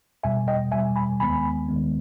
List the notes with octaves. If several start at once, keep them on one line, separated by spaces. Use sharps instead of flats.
E2 B2 G3 E5 G#5
D#5 G5
E2 B2 G3 E5 G#5
G#5 B5
D#2 D#3 G#3 B3 G#5 B5
D#2 D#3 G#3 B3